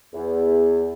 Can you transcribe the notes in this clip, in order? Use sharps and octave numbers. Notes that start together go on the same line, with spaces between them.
E2